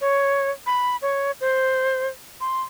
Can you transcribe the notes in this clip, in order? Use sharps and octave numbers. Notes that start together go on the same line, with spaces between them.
C#5
B5
C#5
C5
C6